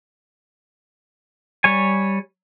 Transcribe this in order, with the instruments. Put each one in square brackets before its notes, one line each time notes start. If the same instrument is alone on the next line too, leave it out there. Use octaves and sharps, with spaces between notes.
[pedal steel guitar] G3 C#5 G#5